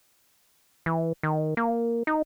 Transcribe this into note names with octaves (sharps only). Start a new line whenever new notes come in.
E3
D#3
A#3
D#4